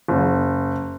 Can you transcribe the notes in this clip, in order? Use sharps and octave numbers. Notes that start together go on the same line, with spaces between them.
F#1